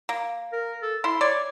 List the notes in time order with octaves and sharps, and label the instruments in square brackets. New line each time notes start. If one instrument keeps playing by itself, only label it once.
[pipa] A#3
[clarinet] A#4
A4
[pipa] E4 [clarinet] C6
[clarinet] C#5 [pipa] D5